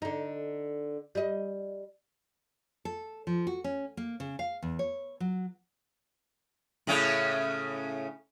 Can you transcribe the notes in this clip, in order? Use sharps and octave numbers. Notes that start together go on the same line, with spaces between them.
D3 D#4
G3 D#5
A4
F3
F#4
C#4
A#3
C#3
F5
E2
C#5
F#3
A2 C#3 C#4